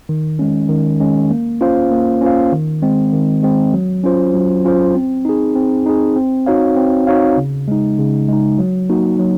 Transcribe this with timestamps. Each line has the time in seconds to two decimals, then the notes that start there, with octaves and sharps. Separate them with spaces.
0.09 D#3
0.39 G#3 C#4
0.69 D#3
1.00 G#3 C#4
1.30 A#3
1.61 C#4 F4 C5 F5
1.91 A#3
2.21 C#4 F4 C5 F5
2.52 D#3
2.82 G#3 C4
3.13 D#3
3.43 G#3 C4
3.74 F#3
4.04 C#4 F4 C5
4.34 F#3
4.65 C#4 F4 C5
4.95 C4
5.25 D#4 G#4
5.56 C4
5.86 D#4 G#4
6.16 C4
6.46 D#4 F#4 C#5 F5
6.76 C4
7.07 D#4 F#4 C#5 F5
7.37 C#3
7.68 G#3 D#4
7.99 C#3
8.28 G#3 D#4
8.59 F#3
8.89 A#3 D#4 F#4
9.19 F#3